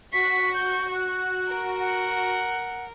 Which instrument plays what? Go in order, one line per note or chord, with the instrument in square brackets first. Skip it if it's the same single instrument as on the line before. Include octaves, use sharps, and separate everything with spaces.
[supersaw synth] F#4 [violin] C#6 [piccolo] B6
[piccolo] G6
F#6
[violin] A#4
[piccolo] F#5